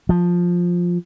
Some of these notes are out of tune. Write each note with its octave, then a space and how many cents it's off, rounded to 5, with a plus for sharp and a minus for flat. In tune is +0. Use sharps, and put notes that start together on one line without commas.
F3 +10